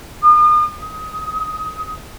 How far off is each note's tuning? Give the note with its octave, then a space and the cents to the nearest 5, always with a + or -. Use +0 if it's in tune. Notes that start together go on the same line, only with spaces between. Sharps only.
D#6 -40
D#6 +20